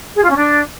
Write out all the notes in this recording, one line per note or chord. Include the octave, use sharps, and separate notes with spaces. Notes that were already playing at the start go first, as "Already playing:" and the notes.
G#4
F4
C#4
D4